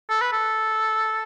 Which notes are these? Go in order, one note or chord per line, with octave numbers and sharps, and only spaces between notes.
A4
B4
A4